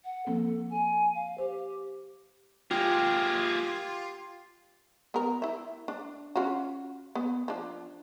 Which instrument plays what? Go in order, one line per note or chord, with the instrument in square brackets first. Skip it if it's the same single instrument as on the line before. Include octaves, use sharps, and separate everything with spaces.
[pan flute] F#5
[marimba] F3 A#3 C4 [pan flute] A4
[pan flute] G#5
F5
[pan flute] G4 [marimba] C5
[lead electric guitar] A#3 G#4 [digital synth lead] F4 [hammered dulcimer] G4
[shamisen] B3 A#4
E4 E5
D4
C#4 F4 F#4
B3
F3 D4